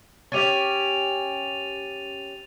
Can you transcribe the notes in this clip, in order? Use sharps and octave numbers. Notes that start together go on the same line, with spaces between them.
C#4 G4 C#5 A6 D#7 F7